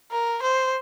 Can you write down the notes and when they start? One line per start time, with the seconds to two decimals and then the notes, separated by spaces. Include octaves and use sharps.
0.12 A#4
0.42 C5